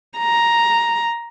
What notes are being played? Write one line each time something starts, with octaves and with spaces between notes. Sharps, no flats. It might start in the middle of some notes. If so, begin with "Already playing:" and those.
A#5